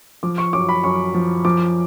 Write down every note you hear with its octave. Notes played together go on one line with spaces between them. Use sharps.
F3 D6
C#6
F#2 D6
B5
F#2 C#6
F3
F3 D6